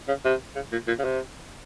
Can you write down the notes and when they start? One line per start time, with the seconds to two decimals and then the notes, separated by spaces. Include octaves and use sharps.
0.08 C#3
0.25 C3
0.56 C#3
0.72 A#2
0.88 A#2
0.99 C#3
1.05 C3